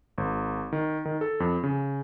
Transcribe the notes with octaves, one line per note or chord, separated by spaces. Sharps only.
G#1
D#3
D#3
A4
F2
C#3